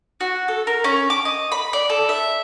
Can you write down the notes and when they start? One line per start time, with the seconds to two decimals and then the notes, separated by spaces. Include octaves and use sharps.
0.21 F#4
0.48 A4
0.67 A#4
0.84 C#4
1.10 D6
1.25 D#5
1.52 B5
1.73 D5
1.90 A4
2.09 E5